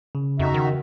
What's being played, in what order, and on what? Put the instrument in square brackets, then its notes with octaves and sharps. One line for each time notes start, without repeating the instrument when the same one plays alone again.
[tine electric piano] C#3
[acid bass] F2 [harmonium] D#4 F#4 E5
[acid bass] D#3